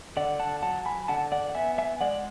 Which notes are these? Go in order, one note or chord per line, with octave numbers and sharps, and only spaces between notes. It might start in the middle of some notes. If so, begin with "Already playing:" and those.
D3 D5 F#5
F#5 A5
F#3 F#5 A5
G#5 B5
D3 F#5 A5
D5 F#5
F#5
B3 E5 G#5
E5 G#5
G#3 D5 F#5